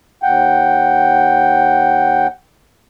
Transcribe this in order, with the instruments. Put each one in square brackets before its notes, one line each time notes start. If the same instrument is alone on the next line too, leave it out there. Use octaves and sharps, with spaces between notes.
[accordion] D#2 F#5 G5